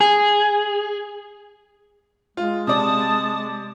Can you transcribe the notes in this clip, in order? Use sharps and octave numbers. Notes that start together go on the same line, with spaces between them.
G#4
G#3 F4
C3 D5 A5 D#6